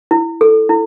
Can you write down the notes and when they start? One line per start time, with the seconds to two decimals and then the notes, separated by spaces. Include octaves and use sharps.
0.11 E4
0.41 A4
0.69 E4